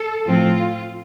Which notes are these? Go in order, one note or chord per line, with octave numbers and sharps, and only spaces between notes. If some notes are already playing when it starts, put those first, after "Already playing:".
Already playing: A4
A2 F3 C4 F4